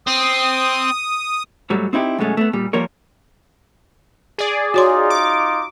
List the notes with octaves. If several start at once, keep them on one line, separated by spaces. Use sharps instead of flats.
C4 D#6
G#2 F#3 G3 A3
C4 D#4 E4 F#4 G4
F#2 B2 G#3 A3 C#4
A3 B3
A#2 G3
F3 G3 A#3 A#4 C#5
G#4 D5
D#4 F4 F#4 C#5 C6
D6